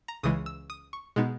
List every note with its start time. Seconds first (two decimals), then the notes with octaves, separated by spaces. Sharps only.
0.08 A#5
0.23 C#2 C#3 E3 G#3 D#6
0.46 E6
0.70 D#6
0.93 C#6
1.16 B2 G#3 B3 D#4